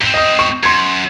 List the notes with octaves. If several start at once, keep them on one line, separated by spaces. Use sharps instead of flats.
G#2 C4 G7
D#5 D#6
C#6
F#2 C6 G#6